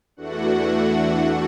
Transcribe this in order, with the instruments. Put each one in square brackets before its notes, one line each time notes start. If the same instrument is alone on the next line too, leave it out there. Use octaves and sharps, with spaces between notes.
[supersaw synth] E2 E3 A3 D4 F#4 F#5